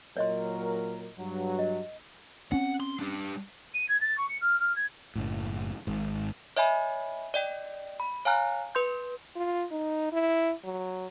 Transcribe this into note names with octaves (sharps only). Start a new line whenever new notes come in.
A#2 F#3 A#4 C#5 D#5 C6
G2 F#3
D#5
C4 C#4 F#5
C6
G3 D4
D#7
G#6
A6
C#6
C#7
F6
F6
G#6
F#1 A2
G#1 G#2
C#5 D#5 E5 G#5 B5
D5 D#5 G5
B5
C#5 F5 G#5 A#5 F6 F#6
B4 C6 G6
F4
D#4
E4
F#3